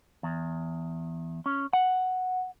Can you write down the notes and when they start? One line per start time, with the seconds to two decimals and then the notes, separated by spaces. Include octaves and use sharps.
0.23 E2
1.46 C#4
1.73 F#5